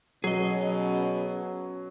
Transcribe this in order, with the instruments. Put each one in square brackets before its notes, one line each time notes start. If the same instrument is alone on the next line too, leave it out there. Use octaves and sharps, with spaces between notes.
[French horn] B2 [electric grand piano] F#3 [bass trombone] C#4 [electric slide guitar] G#4 D#5